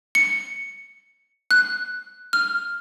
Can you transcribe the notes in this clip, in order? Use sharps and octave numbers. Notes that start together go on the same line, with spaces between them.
C#7
F#6
F6